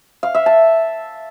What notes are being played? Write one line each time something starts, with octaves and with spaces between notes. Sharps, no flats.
F5
E5
A5